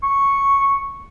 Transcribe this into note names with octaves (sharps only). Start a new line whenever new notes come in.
C#6